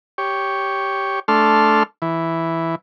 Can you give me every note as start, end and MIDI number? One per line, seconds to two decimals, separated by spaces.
0.18 1.20 67
0.18 1.20 73
1.28 1.83 57
1.28 1.83 62
1.28 1.83 69
1.28 1.83 84
1.28 1.83 89
2.02 2.75 52